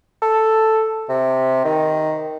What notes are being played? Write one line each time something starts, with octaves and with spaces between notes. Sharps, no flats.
A4
C3
D#3